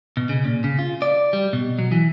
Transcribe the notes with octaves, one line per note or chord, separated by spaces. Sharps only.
B2
C#3
A#2
C#3
F4
D5
G3
B2
F#3
E3